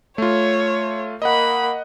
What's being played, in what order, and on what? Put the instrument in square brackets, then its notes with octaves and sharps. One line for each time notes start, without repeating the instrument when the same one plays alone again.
[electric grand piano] A3 F4 [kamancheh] C#5
[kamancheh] A#3 B5 [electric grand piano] D#5 F#5